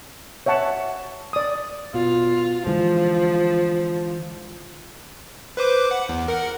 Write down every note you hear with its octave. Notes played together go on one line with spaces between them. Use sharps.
C#5 E5 F#5 A5
D5 D#6
B2 F4
D3 E3 F3 G#3
B4 C5 D6
F#5
E2
A#4 F#5